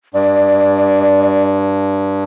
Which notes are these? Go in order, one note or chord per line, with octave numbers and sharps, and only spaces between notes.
G2 D5